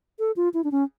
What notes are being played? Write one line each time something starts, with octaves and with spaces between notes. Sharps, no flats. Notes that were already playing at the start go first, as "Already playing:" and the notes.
A4
F4
E4
D4
C#4